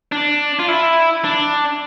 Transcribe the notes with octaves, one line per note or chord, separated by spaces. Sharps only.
D4
F4
E4
D4